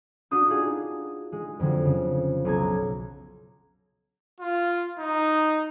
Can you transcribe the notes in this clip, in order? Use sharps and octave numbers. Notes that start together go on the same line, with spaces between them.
D4 F#4 D#6 G6
D4 D#4 F4 F#4 G#4
G#3
F2 D3 F#3
C#3
B1 F#3 A#5 G#6
F4
D#4